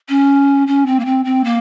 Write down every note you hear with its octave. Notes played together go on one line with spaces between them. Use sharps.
C#4
C#4
C4
A#3
C4
C4
A#3